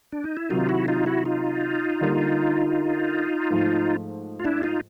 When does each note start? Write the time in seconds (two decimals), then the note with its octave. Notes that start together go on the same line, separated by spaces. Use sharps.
0.12 D4
0.24 D#4
0.37 E4
0.50 C3 D#3 F#3 D#4 F4
0.69 E4 F#4
0.88 D#4 F4
1.06 E4 F#4
1.25 D#4 F4
2.01 D3 G3 A#3
3.50 G#2 F3 A3
4.40 F4
4.44 D4 E4
4.63 D#4 F4